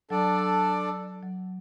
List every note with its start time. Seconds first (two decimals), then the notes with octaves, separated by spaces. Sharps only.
0.10 F#3 D4 A4 D5
1.23 F#3